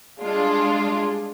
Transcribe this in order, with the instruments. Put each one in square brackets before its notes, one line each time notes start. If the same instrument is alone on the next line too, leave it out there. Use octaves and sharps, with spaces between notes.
[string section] G3 G#3 D4 F4